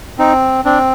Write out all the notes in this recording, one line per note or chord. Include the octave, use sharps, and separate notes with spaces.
C4 D#4
C4 D4